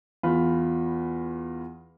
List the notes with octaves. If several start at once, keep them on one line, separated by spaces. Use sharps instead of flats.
E2 F4 B5